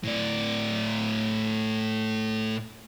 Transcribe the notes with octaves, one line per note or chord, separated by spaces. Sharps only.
A2 D5